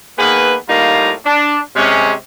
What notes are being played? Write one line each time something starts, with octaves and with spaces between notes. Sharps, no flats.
D#3 A#3 B3 G#4 B4
A2 G3 A#3 D#4 F4 A#5
D4
C3 G#3 C#4